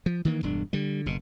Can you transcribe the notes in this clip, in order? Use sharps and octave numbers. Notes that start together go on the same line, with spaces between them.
F3
D#3 E3 A#3
E1 G2 D4
D3 G3
F#1 B2